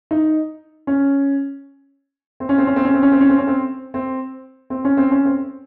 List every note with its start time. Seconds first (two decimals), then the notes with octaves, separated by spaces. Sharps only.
0.11 D#4
0.87 C#4
2.40 C4
2.49 C#4
2.58 C4
2.67 C#4
2.76 C4
2.85 C#4
2.94 C4
3.03 C#4
3.12 C4
3.21 C#4
3.29 C4
3.38 C#4
3.47 C4
3.94 C4
4.70 C4
4.85 C#4
4.97 C4
5.11 C#4
5.26 C4